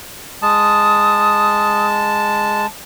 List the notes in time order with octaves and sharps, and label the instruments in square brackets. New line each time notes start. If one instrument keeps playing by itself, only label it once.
[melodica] G#3 A5 [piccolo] D#6